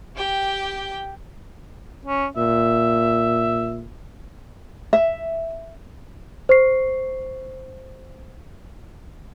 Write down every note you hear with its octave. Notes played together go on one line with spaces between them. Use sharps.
G4 G5
C#4
A#2 E5
E5
C5 C#6 C7